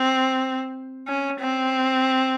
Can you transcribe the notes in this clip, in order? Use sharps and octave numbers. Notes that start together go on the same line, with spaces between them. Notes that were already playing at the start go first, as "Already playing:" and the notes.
Already playing: C4
C#4
C4